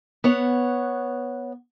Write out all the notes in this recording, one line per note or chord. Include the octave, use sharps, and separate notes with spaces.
B3 C#5 F#5